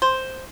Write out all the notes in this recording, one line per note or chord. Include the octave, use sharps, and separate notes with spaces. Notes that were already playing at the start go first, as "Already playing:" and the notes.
C5